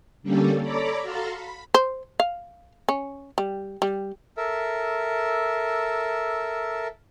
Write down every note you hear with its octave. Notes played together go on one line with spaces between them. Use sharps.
D3 G3 A#3 C#4 G4 A4
A4 C#5 D5 A#5 B5 D6
F#4 A4 F5 A5 A#5 C6
B5
C5
F5
C#4
G3
G3
A4 A#4 E5